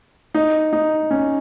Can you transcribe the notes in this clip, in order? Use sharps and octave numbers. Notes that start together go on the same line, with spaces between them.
D#4
D#4
C#4